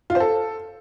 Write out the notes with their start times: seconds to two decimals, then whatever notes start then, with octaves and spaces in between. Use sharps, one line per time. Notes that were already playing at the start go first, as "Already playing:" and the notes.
0.10 F4
0.15 C5
0.20 A4